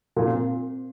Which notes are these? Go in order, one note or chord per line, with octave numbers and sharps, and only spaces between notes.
A#2
C4